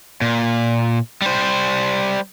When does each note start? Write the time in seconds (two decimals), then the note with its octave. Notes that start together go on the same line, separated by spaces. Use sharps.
0.21 A#2
1.22 G3 C5